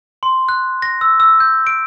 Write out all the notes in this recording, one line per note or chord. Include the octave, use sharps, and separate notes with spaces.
C6
F#6
A#6
E6
E6
G6
D7